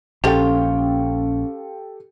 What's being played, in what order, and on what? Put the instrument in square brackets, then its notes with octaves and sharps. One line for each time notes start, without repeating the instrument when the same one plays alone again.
[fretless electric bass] A#1 [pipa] F3 F4 [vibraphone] C#4 [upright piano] G4 A4 G5